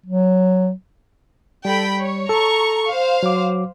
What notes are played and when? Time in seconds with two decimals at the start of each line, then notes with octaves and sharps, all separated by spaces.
0.06 F#3
1.65 G3 A4 G5 B5
2.00 C#5
2.29 A4 A#5 C#6
2.88 C5 F5
3.23 F#3 D6